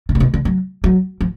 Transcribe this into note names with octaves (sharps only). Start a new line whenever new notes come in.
B2
A#2
B2
D3
F#3
F#3
F3